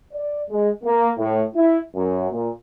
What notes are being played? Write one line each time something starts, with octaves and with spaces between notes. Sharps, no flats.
D5
G#3
A#3
A2
E4
F#2
A#2